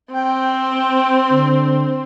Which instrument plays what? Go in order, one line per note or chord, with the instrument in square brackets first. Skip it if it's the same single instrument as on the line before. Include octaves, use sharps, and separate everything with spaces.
[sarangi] C4 [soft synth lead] G5
[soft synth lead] D3